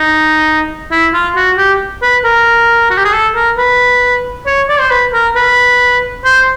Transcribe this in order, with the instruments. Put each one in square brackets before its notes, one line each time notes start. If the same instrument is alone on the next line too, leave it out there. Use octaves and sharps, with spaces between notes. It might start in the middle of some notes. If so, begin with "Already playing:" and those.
Already playing: [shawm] D#4
E4
F4
F#4
G4
B4
A#4
F#4
G4
G#4
A4
A#4
B4
C#5
D5
C5
B4
A#4
B4
C5